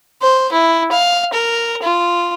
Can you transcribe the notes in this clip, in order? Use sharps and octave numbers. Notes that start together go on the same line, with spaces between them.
C5
E4
F5
A#4
F4